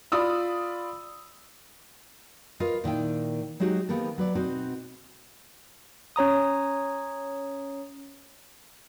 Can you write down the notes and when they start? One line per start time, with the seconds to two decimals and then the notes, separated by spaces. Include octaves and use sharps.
0.12 F4 D5 B5 D#6 E6
2.60 F4 A#4 B4 D#5
2.84 A#2 D#3 E4 G5
3.60 F#3 G#3 D#4 F#4 G4
3.89 D#3 A#3 B3 G4 A4
4.18 F#3 B4 D5
4.35 B2 C4 D#4 F#4
6.16 C#4 C#5 A#5 D#6